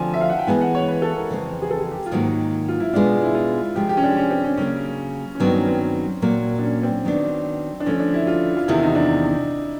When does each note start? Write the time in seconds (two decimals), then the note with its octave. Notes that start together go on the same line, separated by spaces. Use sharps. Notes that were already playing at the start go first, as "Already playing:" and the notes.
Already playing: D3 F3 A3 C4 F4 G#5 A5
0.14 E5
0.21 F5
0.30 F#5
0.39 G5
0.47 E3 G#3 B3 E4 G#5
0.61 F#5
0.75 C#5
0.88 B4
1.02 A4
1.16 A#4
1.29 F2 C#3 E3 G#3 C4
1.62 G#4
1.71 A4
1.81 G#4
1.91 G4
2.06 F4
2.11 G#2 D#3 F#3 A#3 F#4
2.69 F4
2.80 E4
2.93 B2 G#3 B3 D4 F4
3.23 E4
3.35 F4
3.76 C3 F3 G#3 G4
3.89 G4
3.97 C#4
4.03 D4
4.17 C#4
4.31 C4
4.44 C#4
4.57 C#3 F#3 A#3 C#4
5.35 C#4
5.40 G2 D#3 F#3 B3 C4
5.53 C#4
5.67 C4
6.22 A#2 F#3 A#3
6.59 D4
6.63 C#4
6.83 C4
7.05 D#3 F#3 B3 D4
7.80 D4
7.86 D3 F3 A3 C#4
8.00 D4
8.14 E4
8.27 F4
8.57 F4
8.68 E2 C3 D#3 E4
8.83 D#4
8.95 D4